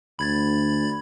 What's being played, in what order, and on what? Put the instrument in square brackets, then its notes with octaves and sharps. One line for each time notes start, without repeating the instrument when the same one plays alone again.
[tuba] D2 [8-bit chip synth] B5 G#6 A6